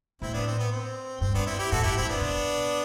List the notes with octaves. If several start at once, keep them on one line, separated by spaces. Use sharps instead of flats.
A2 C4 E4
B3 D4
C4
B3
C4
G2 C4
B3 D4
C4 E4
E4 G4
A2 F#4 A4
G2 E4 G4
F#2 C4 E4
G2 B3 D4
B2